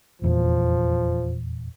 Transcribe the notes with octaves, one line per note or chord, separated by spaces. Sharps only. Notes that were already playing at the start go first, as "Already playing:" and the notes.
F1 E2 A#2 F3